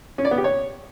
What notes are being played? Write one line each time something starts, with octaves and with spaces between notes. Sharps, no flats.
C#4
D5
B3
G4
C#5